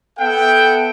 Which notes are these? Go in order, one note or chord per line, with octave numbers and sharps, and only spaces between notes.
B3 A4 E5 F#5 G5